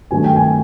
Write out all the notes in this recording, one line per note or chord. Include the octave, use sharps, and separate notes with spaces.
G2 D#3 F#3 A3 G#5
G5
G#5